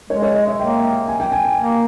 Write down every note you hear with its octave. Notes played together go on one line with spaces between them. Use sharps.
G#3 C#5
C#5
D#5
E5
A#3 G5
G#5
G5
G#5
G#5
A#3